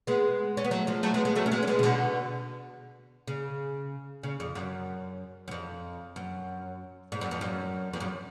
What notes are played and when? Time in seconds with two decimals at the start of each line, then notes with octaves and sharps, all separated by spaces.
0.07 G#3 B3
0.57 C#4
0.64 B3
0.71 F#3 A3
0.87 F3 G#3
1.03 F#3 A3
1.14 G#3 B3
1.25 G#3 B3
1.35 F#3 A3
1.46 C#4
1.51 G#3 B3
1.63 C#4
1.67 G#3 B3
1.79 C#3
1.83 B2 D3
3.27 C#3
4.23 C#3
4.40 F2
4.55 F#2
5.48 F#2
5.51 F2
6.16 F#2
7.12 G#2
7.21 F#2
7.31 F2
7.41 F#2
7.93 F2
8.00 F#2